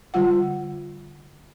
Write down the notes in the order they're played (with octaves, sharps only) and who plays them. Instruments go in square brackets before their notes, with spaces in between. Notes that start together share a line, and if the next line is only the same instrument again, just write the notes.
[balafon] D3 G3 F4 F#5